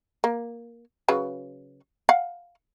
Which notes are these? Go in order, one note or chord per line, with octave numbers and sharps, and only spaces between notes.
A#3
C#3 F#3 B4
F5 F#5